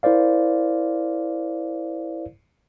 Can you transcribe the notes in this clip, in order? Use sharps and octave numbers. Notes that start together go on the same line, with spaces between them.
E4 A#4 C5 D5 F5